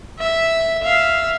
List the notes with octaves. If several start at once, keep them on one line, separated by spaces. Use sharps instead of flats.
E5
E5 F5